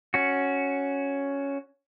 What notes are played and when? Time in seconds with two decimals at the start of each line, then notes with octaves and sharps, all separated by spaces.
0.14 C#4 F#4